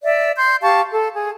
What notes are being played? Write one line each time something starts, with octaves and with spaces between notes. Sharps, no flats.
D5 E5
C6 G6
G4 F5 A5 C#6
A4
G#4